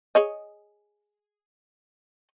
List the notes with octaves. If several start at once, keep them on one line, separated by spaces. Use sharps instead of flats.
G#4 C#5 D#5